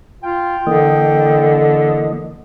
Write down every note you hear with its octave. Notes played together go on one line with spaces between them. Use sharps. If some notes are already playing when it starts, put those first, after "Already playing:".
F4 G5
D3 E3 A#3 D#5